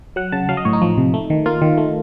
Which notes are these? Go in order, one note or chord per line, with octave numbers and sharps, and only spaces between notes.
F#3 F#5
C#3 A5
F#3 F5
D#5
A2 C#5
D#4
F3
C3
A3
D#3
A#3 F4
D#3
A3